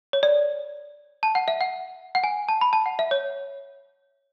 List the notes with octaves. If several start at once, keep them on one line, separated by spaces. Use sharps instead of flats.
C#5
D5
A5
F#5
E5
F#5
F#5
G#5
A5
B5
A5
F#5
E5
C#5